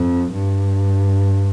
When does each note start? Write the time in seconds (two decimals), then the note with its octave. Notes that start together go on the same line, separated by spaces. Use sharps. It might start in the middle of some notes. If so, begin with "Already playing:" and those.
Already playing: F2
0.31 G2